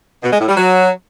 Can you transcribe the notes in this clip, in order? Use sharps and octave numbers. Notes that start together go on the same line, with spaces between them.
B2
G#3
A2
G3
F#3